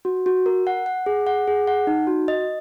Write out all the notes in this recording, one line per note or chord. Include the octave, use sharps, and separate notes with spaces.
F#4
F#4
A#4
F#5
F#5
G#4
F#5
G#4
F#5
D#4
F#4
D#5